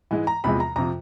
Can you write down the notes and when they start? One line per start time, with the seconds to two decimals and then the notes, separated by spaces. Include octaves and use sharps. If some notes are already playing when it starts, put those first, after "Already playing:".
0.11 G#2 E3 G#3
0.27 A#5
0.44 E2 C3 F3 G#3 B5
0.60 A#5
0.76 F2 C3 F3 A#5